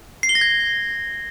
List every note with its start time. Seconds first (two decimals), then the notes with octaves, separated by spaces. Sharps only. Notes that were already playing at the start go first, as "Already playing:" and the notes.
0.23 C7
0.29 G7
0.35 A#6
0.41 G#6